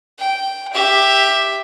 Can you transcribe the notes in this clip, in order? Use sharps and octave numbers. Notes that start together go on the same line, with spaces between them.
G5
G4 E5